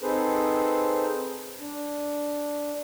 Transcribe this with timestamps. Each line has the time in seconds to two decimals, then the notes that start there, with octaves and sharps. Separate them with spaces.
0.01 C4 D#4 G#4 A4 B4 C5
1.60 D4